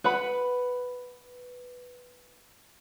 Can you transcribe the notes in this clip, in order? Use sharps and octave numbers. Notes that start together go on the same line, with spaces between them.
B4 F#5 B5